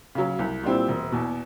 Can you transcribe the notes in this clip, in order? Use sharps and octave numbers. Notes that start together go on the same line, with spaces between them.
C#3 F#3
C2
A#2 G3 C4 E4
E1
E2 B2